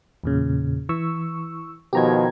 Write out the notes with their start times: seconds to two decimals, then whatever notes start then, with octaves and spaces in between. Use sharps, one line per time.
0.24 E2 A#2 C#3
0.89 E3 C#6 E6
1.93 B2 D#3 F3 G4 A#5 G#6